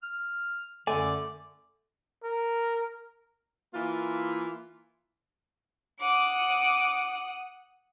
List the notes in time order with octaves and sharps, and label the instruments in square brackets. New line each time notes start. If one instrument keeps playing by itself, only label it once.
[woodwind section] F6
[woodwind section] F#2 D3 [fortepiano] A3 [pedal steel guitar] D5 [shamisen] G#5
[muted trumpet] A#4
[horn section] E3 A#3 F4
[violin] F#5 D#6 [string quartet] D6